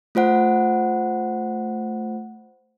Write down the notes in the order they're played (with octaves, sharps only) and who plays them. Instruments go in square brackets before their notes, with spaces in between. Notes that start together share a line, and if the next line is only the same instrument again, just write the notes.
[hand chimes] A3 F4 C5 F#5